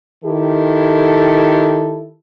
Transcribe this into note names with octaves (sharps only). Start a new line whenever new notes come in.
D#3 E4 G4 A4